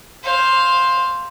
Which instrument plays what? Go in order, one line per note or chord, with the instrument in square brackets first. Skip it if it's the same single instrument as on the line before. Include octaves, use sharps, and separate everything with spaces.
[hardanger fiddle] C5 F5